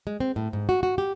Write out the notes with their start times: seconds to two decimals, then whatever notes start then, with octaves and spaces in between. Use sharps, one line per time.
0.07 G#3
0.20 C4
0.36 A2
0.53 G#2
0.69 F#4
0.83 F#4
0.98 G4